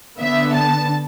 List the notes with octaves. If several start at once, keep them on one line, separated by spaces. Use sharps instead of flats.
D3 B3 E5
A5